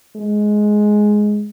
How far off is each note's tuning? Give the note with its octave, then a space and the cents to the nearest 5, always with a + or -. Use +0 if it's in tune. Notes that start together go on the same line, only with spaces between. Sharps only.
G#3 +10